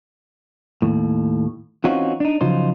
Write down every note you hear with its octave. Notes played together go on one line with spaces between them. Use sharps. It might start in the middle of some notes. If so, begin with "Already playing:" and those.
D#2 A2
E3 C4 C#4 D#4 F4 F#4
D4 D#4
C#3 F3 F#3 D#4 F4 C5